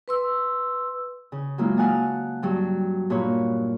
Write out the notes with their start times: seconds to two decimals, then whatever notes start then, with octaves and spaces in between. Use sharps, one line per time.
0.08 B4 C6 E6
1.32 C#3
1.58 F#3 G#3 A#3 E4 F4
1.77 F5 F#5 G#5 A5 D#6
2.43 G2 F#3 G3
3.10 G2 A#2 B4 C#5